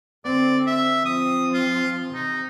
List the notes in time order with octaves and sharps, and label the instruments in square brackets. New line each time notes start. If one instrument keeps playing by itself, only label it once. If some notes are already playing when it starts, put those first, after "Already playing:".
[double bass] D3 C4 [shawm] D5
[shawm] E5
[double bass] F3 C4 [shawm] D#6
[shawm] F4
[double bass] C3 [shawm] D#4